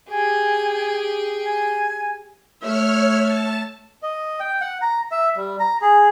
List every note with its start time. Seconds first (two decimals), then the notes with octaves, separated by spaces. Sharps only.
0.10 G4 G#4 G#5
1.45 G#5
2.61 A3 C#5 E5 F6
3.23 A5
4.03 D#5
4.40 G5
4.61 F#5
4.82 A#5
5.11 E5
5.36 G3
5.59 A#5
5.82 G#4